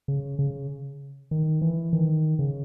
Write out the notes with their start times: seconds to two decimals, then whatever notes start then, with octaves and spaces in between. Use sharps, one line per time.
0.08 C#3
0.39 C#3
1.31 D#3
1.62 E3
1.93 D#3
2.39 C#3